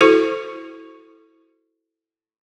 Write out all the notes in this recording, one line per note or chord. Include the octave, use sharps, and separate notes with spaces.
E4 F#4 A4 C5 C#6